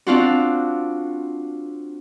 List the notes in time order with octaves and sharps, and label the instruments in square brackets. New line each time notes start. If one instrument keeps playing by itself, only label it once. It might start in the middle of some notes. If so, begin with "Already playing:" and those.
[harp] C4 D4 F4 F#4